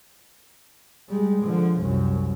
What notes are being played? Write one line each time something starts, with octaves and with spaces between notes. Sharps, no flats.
G3 G#3
D3 F3
C2 F#2